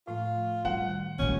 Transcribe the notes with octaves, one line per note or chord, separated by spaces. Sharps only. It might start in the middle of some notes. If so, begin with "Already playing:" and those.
A2 F3 A3 F4
G3 F#5
D#3
A#1 D#3 G3 G#3 C#4